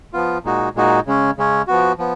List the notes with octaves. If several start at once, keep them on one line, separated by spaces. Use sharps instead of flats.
F3 B3 F4
A#2 G#3 D#4 F#4
A#2 G#3 D#4 F#4
C#3 G#3 C#4
C#3 G#3 C#4
F3 B3 F#4
F3 B3